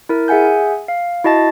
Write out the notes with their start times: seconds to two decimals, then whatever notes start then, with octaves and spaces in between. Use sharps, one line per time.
0.09 E4 A#4
0.28 G#4 E5 F#5 G#5 G6
0.88 F5
1.24 E4 F#4 D#5 A5 A6